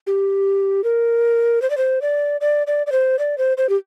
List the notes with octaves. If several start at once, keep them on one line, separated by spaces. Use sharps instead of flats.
G4
A#4
C5
D5
C5
D5
D5
D5
D5
C5
D5
C5
C5
G4